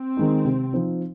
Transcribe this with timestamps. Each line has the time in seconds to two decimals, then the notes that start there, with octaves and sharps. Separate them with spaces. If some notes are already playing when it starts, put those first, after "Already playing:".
Already playing: C4
0.17 D#3 G#3 D#4
0.45 C3
0.73 F3 C4 D#4